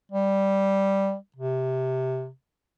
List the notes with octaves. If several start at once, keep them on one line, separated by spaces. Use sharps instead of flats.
G3
C3